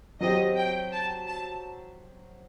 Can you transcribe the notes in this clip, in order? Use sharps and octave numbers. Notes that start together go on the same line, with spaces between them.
F#3 C4 G4 D#5
G5
A5
A5